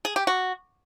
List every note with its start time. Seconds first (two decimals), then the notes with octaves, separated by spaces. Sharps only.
0.05 G#4
0.16 G4
0.27 F#4